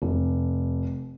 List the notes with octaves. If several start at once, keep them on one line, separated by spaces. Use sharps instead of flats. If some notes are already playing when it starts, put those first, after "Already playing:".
F1